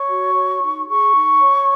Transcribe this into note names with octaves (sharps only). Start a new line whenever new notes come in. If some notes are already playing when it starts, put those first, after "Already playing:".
Already playing: C#5 C#6
F#4
C#5
D#4
G#4 C#6
D#4
C#5